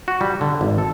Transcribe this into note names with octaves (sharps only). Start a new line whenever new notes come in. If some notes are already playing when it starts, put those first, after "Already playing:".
F#4
G3
D3
G#1
A4